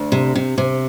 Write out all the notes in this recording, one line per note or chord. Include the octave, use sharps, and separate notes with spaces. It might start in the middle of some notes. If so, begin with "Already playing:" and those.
Already playing: D2
C3
C3
C3